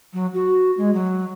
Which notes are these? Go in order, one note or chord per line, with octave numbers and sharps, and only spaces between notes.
F#3
F#4
G#3
F#3